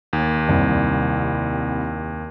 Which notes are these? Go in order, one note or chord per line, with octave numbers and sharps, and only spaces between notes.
D#2
C2